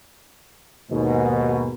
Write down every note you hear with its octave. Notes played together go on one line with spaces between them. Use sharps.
D#2 G#2 B2